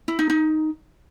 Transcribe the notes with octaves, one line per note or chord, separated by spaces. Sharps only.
E4
D#4
D#4